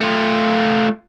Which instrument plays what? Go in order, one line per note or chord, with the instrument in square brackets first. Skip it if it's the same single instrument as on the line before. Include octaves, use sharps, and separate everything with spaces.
[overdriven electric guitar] A3 F4